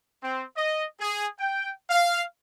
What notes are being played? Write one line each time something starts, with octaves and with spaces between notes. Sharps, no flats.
C4
D#5
G#4
G5
F5